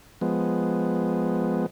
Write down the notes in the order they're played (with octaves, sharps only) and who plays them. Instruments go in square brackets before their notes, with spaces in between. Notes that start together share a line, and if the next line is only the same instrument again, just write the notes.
[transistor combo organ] F3 G#3 B3